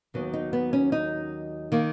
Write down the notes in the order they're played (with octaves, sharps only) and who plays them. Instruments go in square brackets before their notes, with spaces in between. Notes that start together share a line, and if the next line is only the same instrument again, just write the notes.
[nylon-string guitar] D#2 D#3 F#3 B3
D#4
B3
C#4
D#4
D#3 A#3